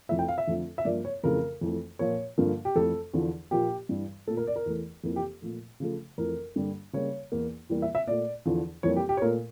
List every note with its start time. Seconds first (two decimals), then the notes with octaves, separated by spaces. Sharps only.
0.09 F2 E3 A3 E5
0.19 G5
0.28 F5
0.38 E5
0.47 F2 D3 F3 A3
0.78 E5
0.85 G2 F3 A#3 D5
1.05 C#5
1.24 F2 C#3 E3 A3 A#4
1.61 F2 E3 A3
1.99 A#2 F3 A#3 C#5
2.38 G2 D3 F3 A#3
2.65 G4
2.76 F2 E3 A3 A4
3.13 E2 D3 F3
3.51 A#2 F3 A#3 G4
3.89 G2 E3 G3
4.27 A#2 A3 A4
4.37 A#4
4.47 D5
4.56 A#4
4.66 E2 E3 A3
5.04 F2 E3 A#3
5.16 G4
5.42 A#2 F3 A3
5.80 C#3 F3 A3
6.18 F2 E3 A3 A#4
6.56 G2 D3 G3 A#3
6.93 C#3 G3 A#3 C#5
7.32 E2 E3 A#3
7.70 E2 E3 G3 A#3
7.82 E5
7.95 E5
8.07 A#2 A3 D5
8.46 E2 D3 F3
8.83 F2 E3 G3 A#3 C#5
8.96 G4
9.09 G4
9.17 C#5
9.22 A#2 A3 A#4